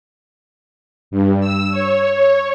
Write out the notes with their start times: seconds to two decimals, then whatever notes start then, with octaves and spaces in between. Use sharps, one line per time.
1.11 G2
1.40 E6
1.71 C#5
2.13 C#5